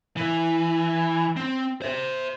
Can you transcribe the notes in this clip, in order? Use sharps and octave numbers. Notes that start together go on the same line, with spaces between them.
E3
C4
C5 E5